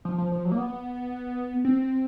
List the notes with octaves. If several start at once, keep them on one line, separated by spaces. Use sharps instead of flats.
F3
F3
F3
F#3
A#3
B3
C4